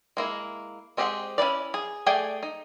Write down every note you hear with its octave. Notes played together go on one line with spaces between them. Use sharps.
G#3 A#3 E4
G#3 C4 G4 G#4 F#5
C#4 E4 B4 D5
G#4
A3 G#4 D5 G5 G#5
D#4